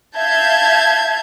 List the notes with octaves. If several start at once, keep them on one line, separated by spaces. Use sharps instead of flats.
E5 F5 A5 G6 G#6